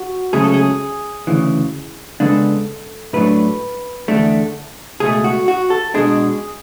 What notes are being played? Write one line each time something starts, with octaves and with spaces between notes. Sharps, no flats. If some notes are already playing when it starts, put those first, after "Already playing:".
Already playing: F#4
C#2 C#3 F#3 A3 C#4 G#4
A4
G#4
D2 C#3 E3
C#3 G#3 B3 D4 A4
A2 F#3 A3 D4 B4
E2 D3 A3 D4
C#2 B2 A3 G#4
F#4
F#4
A4
B2 G#3 D4 G#4